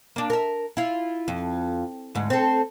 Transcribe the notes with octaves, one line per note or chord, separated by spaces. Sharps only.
A#3 D4
A#4 E5
E4 F4
F2
D2 G#2
C4 A4